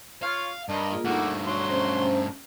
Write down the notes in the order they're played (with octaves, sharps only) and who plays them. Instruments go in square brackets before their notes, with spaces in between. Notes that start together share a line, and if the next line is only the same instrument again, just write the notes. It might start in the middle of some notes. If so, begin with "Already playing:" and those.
[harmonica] F4 C#5 [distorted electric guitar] F5
[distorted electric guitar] G2 [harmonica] A#4 D#5 [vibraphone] A5
[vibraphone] A#3 F4 G#4
[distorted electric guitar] G2 A3 [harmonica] A#3 F#4 [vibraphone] D#4 A4 F#5
[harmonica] F#3 C6 [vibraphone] C#6
[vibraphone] C#4 C5 A#5